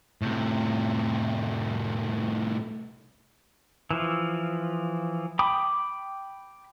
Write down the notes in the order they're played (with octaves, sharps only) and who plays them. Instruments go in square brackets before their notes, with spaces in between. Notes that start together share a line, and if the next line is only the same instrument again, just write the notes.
[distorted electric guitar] A2 C3
[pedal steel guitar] E3 F3
G5 B5 D6 D#6